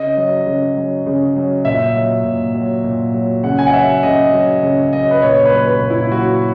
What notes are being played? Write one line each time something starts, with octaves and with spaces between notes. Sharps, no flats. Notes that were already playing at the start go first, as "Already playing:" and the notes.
Already playing: C#3 D#5
F#3
C#3
F#3
C#3
F#3
A#2 E5
F#3
A#2
F#3
A#2
F#3
C#3 F#5
G#5
F#5
F#3 E5
C#3 D#5
F#3
C#3
F#3 D#5
B4
A#2 C#5
C#5
B4
F#3
B4
A#2
E4
F#3 F#4